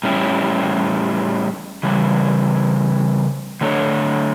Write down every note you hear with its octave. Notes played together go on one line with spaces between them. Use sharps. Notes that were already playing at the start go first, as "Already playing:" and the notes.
A2 G3 C#4 E4 G4
C#3 E3 G3
D3 A3 D4 A4 C#5